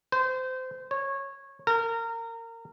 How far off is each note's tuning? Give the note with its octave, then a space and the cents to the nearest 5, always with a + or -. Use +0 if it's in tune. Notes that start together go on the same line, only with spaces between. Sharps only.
C5 -25
C#5 -15
A#4 -25